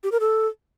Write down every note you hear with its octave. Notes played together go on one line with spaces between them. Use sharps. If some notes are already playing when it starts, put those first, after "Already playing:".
G4
A#4
A4